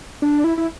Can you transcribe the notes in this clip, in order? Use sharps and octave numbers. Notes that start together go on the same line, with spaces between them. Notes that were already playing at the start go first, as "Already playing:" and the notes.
D4
E4
E4